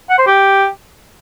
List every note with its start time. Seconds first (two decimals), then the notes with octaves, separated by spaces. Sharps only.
0.10 F#5
0.18 C5
0.27 G4